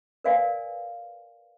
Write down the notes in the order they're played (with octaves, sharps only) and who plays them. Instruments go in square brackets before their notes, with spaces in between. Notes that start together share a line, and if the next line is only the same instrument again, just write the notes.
[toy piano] A#4 B4 D5 F5 G#5